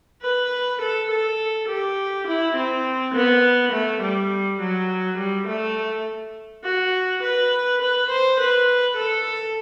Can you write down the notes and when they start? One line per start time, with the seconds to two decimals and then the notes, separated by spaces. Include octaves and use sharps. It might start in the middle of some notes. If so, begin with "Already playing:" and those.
0.21 B4
0.80 A4
1.08 A4
1.67 G4
2.25 E4
2.55 C4
3.13 B3
3.71 A3
4.01 G3
4.59 F#3
5.17 G3
5.46 A3
6.63 F#4
7.21 B4
7.80 B4
8.09 C5
8.38 B4
8.96 A4